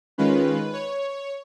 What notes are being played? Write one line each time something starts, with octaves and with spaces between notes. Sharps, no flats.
D#3 G#3 C#4 F4 B4
C#5